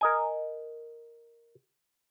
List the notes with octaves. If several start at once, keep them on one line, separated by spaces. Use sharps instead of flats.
A#4 D#5 G#5